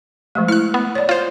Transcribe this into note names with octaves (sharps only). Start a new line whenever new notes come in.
F3 G#3 A3
E4 F6 F#6
B3
C#5 D5
F4 C5